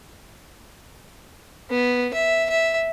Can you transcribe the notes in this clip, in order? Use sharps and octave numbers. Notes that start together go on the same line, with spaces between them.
B3
E5
E5